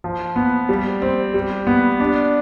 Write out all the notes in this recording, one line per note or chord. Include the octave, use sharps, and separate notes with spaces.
F3
B3
G3
C4
G3
B3
D4